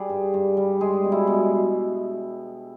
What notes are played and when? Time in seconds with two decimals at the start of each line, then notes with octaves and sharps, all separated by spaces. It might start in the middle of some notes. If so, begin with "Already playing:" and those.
Already playing: G3 G#4
0.10 G2
0.34 G2
0.57 G3
0.81 G#3 G#4
1.04 B2
1.12 E4
1.27 B2